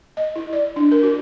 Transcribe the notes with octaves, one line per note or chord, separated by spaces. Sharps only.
D#5
E4
D5
D4
A#4
F#4